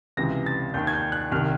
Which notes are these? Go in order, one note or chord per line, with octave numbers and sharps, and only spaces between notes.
C#2 C3 E3 A#6
A6
D#2 D#3 G6
G#6
G6
F#6
C2 C3 D#3 F6